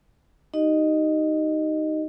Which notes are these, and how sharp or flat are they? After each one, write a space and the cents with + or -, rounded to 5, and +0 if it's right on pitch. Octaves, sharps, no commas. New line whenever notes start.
D#4 +0 G4 -40 D#5 -10